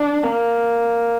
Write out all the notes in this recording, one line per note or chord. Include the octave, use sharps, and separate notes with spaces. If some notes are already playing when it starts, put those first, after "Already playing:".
Already playing: D4
A#3